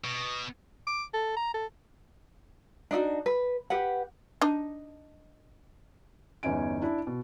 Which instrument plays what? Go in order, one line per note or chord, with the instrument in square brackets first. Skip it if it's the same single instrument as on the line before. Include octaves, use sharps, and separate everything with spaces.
[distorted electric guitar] B2
[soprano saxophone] D6
A4
A#5
A4
[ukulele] D4 D#4 F4 F#4
B4
G4 B4 F#5
[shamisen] D4 D#4
[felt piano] G1 E2 C#4 D#4 G#5 D7
D4 E4
B2